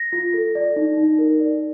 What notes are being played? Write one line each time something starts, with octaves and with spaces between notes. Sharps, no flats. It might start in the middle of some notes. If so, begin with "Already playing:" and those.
Already playing: A#6
F4
A4
D5
D#4
D#4
A#4
D5